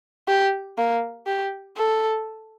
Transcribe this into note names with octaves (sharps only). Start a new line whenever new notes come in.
G4
A#3
G4
A4